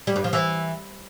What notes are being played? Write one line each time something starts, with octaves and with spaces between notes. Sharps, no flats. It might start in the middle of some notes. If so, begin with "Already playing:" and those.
G3
G2
F3
E3